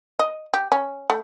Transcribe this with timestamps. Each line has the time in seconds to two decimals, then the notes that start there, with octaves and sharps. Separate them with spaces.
0.19 D#5
0.54 G4
0.72 C#4
1.10 A3